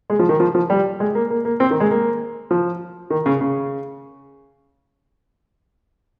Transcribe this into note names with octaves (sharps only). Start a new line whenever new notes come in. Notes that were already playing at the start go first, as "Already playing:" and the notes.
G#3
F3
D#3
F3
F3
G3
G#3
A#3
A#3
A#3
C4
D#3
G#3
A#3
F3
D#3
C#3
C#3